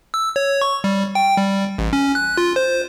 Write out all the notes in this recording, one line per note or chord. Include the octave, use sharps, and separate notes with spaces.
E6
C#5
C#6
G3
G5
G3
A1
C#4
F#6
F4
C5